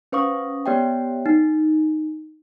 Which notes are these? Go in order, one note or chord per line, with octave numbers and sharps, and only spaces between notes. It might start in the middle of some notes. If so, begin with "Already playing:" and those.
C#4 B4 C5 F5 C#6 D#6
B3 G4 C#5 D5 E5 G5
D#4